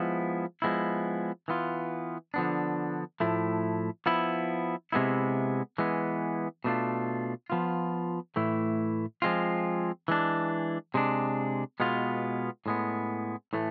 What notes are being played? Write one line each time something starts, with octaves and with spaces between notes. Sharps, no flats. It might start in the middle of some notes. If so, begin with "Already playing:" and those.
Already playing: F3 G#3 B3 E4
F3 G#3 B3 E4
E3 B3 F4
D3 F3 B3 D4
A2 F3 A3 E4
F3 B3 E4
C3 G#3 B3 E4
E3 G#3 B3
B2 A3 D4 F4
F3 B3 F4
A2 E3 A3 E4
F3 G#3 C4 F4
E3 G#3 D4
C3 G#3 D4
B2 G#3 B3 F4
A2 G#3 B3
A2 E3 A3